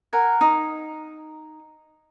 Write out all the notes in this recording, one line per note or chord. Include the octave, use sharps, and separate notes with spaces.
A#4 F#5 G#5
D#4